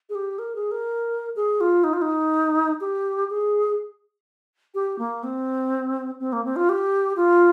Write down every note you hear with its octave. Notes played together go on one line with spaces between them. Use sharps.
G#4
G4
A#4
G#4
A#4
G#4
F4
D#4
F4
D#4
G4
G#4
G4
A#3
C4
C4
A#3
C4
F4
G4
F4